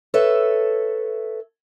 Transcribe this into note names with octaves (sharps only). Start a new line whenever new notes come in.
A4 B4 C#5 E5